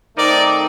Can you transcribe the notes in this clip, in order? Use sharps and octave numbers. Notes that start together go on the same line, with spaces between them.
D#3 A3 C4 D#4 A#4 D5